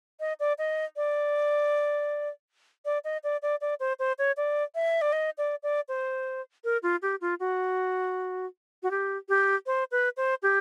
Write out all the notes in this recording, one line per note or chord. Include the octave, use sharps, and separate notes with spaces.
D#5
D5
D#5
D5
D5
D#5
D5
D5
D5
C5
C5
C#5
D5
E5
D5
D#5
D5
D5
C5
A#4
F4
G4
F4
F#4
F#4
G4
G4
C5
B4
C5
G4